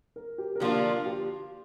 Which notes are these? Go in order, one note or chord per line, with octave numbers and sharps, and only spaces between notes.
A#4
G4
A#4
D3 F3 A#3 D4 F4 G4
G4